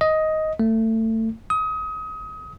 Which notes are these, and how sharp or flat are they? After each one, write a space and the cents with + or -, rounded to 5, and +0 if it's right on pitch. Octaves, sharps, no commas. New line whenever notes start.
D#5 +10
A3 +25
D#6 +30